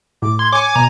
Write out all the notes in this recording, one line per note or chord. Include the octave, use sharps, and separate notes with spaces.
A2 D6
C6 G#6
C#5 G#5 D6 C#7
B2 A#5